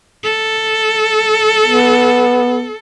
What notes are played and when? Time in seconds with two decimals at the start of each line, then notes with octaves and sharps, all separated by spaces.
0.24 A4
1.65 B3